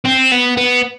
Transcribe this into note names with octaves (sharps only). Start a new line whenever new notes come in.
C4
B3
B3